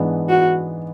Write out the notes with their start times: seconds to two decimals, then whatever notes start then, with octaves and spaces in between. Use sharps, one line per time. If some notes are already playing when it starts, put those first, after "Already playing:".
Already playing: G#2 E3 B3 D4 G#4
0.29 F#4